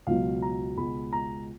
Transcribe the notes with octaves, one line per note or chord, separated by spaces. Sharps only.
C#2 B2 F#3 F5
A#5
C#2 B2 G#3 B5
A#5